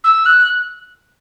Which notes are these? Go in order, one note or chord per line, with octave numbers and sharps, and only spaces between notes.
E6
F#6